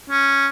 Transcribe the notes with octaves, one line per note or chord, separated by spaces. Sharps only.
C#4